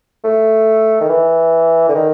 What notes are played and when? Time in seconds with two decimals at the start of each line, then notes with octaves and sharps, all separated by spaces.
0.24 A3
1.01 D#3
1.09 E3
1.89 D3
1.95 D#3